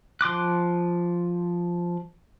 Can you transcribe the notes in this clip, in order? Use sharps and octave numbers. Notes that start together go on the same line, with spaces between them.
F3 C6 D6 F#6